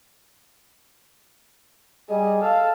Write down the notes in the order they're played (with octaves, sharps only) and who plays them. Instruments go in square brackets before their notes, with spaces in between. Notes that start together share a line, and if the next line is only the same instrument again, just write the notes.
[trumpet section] G3 G#4 [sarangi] D#5
[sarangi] A4 [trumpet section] F5